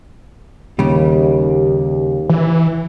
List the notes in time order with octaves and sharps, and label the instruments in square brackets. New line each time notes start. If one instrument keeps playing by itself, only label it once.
[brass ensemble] D#2 [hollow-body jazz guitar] C#3 G3
[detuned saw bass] E3